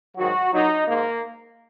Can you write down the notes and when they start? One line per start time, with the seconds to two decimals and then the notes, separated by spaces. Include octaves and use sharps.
0.16 G#2 D#3 F#3 F#4
0.52 A#2 F#3 D#4
0.88 G#2 A#3